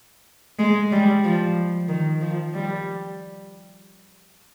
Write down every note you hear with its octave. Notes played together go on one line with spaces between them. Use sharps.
G#3
G3
F3
D#3
F3
G3